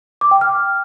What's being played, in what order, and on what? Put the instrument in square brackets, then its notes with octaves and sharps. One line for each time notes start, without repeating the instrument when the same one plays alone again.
[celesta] D6
G5
F6